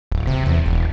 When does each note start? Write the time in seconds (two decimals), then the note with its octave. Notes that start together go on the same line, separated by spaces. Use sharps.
0.12 D1
0.27 C3
0.46 E2
0.66 E1